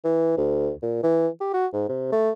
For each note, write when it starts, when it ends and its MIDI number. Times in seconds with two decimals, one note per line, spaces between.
0.05 0.37 52
0.37 0.71 38
0.83 1.00 46
1.03 1.28 52
1.41 1.50 67
1.54 1.67 66
1.73 1.88 44
1.89 2.08 48
2.12 2.31 57